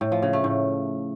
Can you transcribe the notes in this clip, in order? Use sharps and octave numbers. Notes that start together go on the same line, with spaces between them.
A2
F3
C#3
A3
A2